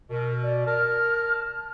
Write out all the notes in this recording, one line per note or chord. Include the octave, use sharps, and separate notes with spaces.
B2 A#4
D5
A#4 A5 F6